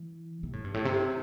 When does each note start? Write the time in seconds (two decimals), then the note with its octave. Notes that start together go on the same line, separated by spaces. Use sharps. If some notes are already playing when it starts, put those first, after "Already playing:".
Already playing: E3
0.43 C3
0.53 A2
0.64 G2
0.74 A2
0.85 C3